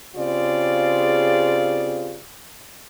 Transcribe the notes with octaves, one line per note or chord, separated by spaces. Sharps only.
C#3 C4 F4 G4 G#4 D5